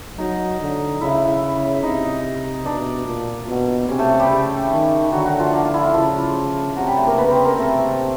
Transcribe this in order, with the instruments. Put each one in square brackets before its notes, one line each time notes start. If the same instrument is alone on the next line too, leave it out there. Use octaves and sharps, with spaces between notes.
[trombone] F#3 [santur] D#4 D#5
[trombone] D3
[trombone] C#3 [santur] E4 E5
[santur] E5
[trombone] C3 [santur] D#4 D#5
[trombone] B2 [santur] D4 D5
[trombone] A#2
B2
[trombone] C3 [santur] C#4 C#5
[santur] A3 A4
A3 A4
G3 G4
[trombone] C#3
D#3
[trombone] D3 [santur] F#3 F#4
[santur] F#3 F#4
F3 F4
D4
F4
E4
[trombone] C#3 [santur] F3 F4
[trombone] C3 [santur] F#3 F#4
[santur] G3 G4
A3 A4
A#3 A#4
[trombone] C#3 [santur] B3 B4
[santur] C4 C5
A#3 A#4
[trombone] C3 [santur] A3 A4